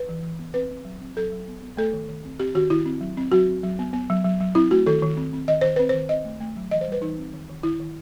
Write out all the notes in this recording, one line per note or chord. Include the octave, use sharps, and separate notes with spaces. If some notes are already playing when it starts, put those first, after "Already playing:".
Already playing: B4
E3
E3
B3
C4 B4
C4
F#3
C4
F#3 A4
F#3
B3
B3
A3 A4
D#3
D#3
C4
C4 G4
D#3 F#4
D#3 E4
C4
F#3
C4
F#3 F#4
C4
F#3
B3
B3
F#3
F#3
F#3
C4 E4
A3 F#4
D#3 A4
D#3
C4
C4
D#3 D#5
D#3 C5
C4 B4
C5
D#3
C4 D#5
A3
A3
F#3
E3 D#5
C5
G3
B4
E3 D#4
C4
D#3
D#3
D#3 E4
D#3